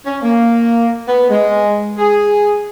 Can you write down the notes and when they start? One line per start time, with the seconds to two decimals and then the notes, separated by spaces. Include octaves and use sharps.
0.06 C#4
0.22 A#3
1.08 B3
1.30 G#3
1.98 G#4